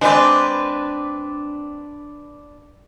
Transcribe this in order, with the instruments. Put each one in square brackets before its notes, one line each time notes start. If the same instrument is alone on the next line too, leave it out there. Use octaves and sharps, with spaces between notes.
[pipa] G#3 C4 [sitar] D4 B4 D5